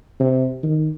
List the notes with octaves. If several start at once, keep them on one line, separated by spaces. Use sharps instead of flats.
C3
D#3